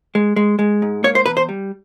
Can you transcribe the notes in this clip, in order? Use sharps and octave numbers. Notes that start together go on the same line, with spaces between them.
G#3
G#3
G#3
G#2
A#3 C#5
C5
E2 B4
C5
G3